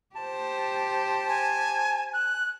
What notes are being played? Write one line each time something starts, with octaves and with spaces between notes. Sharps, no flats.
G4 C5 A5
G#5
F#6